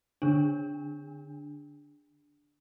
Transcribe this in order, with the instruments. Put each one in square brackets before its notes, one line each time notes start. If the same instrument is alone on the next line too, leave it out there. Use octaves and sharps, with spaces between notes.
[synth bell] D3 D4